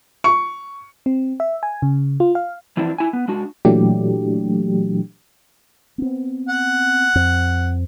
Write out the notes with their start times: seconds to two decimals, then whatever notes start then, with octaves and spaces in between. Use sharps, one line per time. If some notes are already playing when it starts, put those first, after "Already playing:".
0.24 C#6
1.06 C4
1.40 E5
1.63 G#5
1.82 C#3
2.20 F4
2.35 F5
2.77 E3 F3 C4 D4 E4
2.98 E4 G#5
3.13 B3
3.28 G#3 D4 F#4
3.65 A#2 E3 F#3 A3 D4 G4
5.98 B3 C4
6.49 F#5
7.15 F2 C4